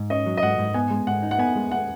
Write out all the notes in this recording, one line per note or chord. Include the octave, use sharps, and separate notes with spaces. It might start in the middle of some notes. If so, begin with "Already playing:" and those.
Already playing: G#2
C#4 D#5
F#3
D#5
G#2 F#5
G#2
B3 G#5
G#3
G#2 F#5
D#4
F#5
B3 G#5
G#3
F#5